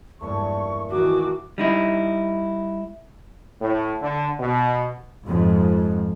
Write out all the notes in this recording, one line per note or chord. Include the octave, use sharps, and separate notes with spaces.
E2 G2 A#2 F3 A3 C#6
D#3 E3 F#4 D6
G3 D#4 E4
A2
D3
B2
F2 G#2